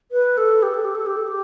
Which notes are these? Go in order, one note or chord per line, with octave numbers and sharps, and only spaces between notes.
B4
A4
G4
A4
G4
A4
G4
A4
G4